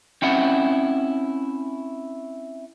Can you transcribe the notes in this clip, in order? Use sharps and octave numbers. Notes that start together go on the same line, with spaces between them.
C4 C#4 E4 F#5